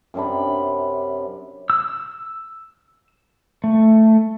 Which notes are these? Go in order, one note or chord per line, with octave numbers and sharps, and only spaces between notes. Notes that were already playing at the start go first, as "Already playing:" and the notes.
F#2 C3 D4 B5
E6
A3